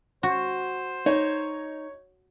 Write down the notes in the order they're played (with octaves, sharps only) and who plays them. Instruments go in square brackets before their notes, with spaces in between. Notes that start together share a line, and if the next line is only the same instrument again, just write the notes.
[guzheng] F#4 [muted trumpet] C5
[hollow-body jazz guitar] D#4 [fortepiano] C#5